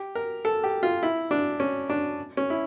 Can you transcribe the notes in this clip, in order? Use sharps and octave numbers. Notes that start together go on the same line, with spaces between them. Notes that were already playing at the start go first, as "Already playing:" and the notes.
Already playing: G4
A#4
A4
G4
F4
E4
D4
C#4
D4
C#4
E4